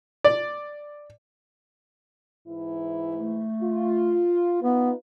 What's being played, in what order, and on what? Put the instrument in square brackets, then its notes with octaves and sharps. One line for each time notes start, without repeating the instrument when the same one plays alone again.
[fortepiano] D5
[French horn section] G#2 E3 E4
[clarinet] A3
[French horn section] F4
[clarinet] B3 [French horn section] D#4 F4 B4